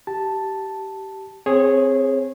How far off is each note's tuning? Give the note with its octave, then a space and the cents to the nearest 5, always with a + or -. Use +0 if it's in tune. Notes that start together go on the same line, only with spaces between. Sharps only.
G4 -20 A5 +0
C4 +0 G#4 +0 C#5 -25